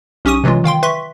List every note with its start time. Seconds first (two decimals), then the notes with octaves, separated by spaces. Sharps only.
0.25 B1 C#4 G4 C#6 D#6 D#7
0.44 C3 E3 F#3 G#3 F4
0.64 D#3 F5 G5 C6
0.83 B4 E5 C6 C#6 B6